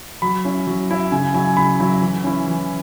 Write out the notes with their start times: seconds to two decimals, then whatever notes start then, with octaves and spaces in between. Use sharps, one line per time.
0.22 F#3 B5
0.45 C#4 E4
0.67 F#3
0.90 C#4 E4
1.12 C#3 G#5
1.34 F#3 E4 G#5
1.57 C#3 B5
1.80 F#3 E4
2.02 E3
2.24 C#4 E4
2.47 E3